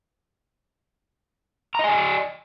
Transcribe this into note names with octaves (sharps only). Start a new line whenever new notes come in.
D5 D#5 G#5 A#5